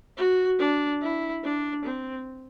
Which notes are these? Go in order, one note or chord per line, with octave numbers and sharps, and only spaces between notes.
F#4
D4
E4
D4
C4